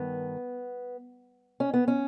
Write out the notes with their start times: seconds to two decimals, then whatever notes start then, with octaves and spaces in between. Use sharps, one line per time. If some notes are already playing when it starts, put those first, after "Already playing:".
Already playing: G2 D#3 B3
1.60 C#4
1.73 B3
1.88 C#4